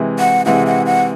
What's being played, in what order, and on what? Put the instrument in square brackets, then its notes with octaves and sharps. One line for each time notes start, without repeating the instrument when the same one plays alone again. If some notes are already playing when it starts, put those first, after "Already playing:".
Already playing: [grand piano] C3 E3 G#3
[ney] F#5
[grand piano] C3 E3 G#3 [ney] F#5
[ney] F#5
F#5